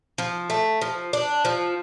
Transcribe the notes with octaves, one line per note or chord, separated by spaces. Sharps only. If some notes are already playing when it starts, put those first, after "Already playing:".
F3
A3
F3
D4
F3